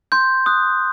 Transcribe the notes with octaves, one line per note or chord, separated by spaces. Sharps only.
C6 G6
D#6 F#6